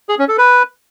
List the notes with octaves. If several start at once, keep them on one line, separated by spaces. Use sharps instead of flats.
G#4
C#4
A4
B4